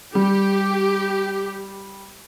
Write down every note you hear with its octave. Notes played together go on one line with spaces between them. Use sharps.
G3 G4